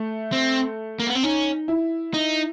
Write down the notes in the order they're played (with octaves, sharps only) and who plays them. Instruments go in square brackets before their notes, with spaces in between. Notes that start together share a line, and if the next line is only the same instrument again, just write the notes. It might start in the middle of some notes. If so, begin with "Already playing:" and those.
Already playing: [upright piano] A3
[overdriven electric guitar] C4
A#3
B3
C4
[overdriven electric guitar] C#4 [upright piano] D#4
[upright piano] E4
[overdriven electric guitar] D#4